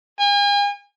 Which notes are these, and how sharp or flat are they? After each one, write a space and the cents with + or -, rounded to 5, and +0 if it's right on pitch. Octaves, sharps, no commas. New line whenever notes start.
G#5 -40